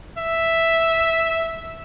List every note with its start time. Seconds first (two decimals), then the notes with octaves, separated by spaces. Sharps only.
0.18 E5